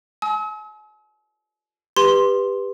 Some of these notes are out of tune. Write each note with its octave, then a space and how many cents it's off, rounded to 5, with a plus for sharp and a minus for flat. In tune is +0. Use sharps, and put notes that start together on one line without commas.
G#5 +45 E6 -45
G4 +20 B4 +0 C6 +5